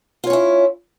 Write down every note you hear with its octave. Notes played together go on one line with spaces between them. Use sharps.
C#4 E4 F4 C#5